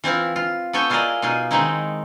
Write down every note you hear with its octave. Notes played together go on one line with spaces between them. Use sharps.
E3 C4 E4 F4
F4
B3 A4 B4 C#5 G5 G#5
E4 F4 G#4 A#4 D5 D#5
B2 D#4 F4 G#4
D#3 G#3 C4 D#4 E4